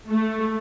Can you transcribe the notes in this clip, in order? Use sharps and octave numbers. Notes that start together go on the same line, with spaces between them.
A3